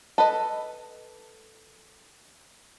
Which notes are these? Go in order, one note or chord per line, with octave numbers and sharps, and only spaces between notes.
A4 B4 D#5